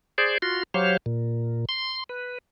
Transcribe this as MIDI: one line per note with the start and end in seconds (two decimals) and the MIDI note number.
0.18 0.38 68
0.18 0.38 72
0.18 0.38 74
0.42 0.63 65
0.42 0.63 66
0.42 0.63 84
0.74 0.97 54
0.74 0.97 67
0.74 0.97 72
0.74 0.97 73
0.74 0.97 77
1.06 1.65 46
1.69 2.04 84
2.09 2.38 71